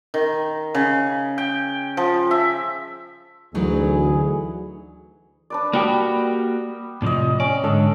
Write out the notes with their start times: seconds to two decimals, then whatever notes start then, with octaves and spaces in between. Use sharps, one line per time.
0.14 D#3
0.74 C#3
1.38 G5
1.97 F3
2.31 E5
3.55 D2 E3 F#3 D#4 G#4
5.50 D4 B4 D5
5.73 G3 A#3 F#4 G4 D#6
7.02 A2 C3 F3 D5 D#5
7.40 C#4 D5
7.64 G#2 D3 A4 D#5